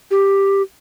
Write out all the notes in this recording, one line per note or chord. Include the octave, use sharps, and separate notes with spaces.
G4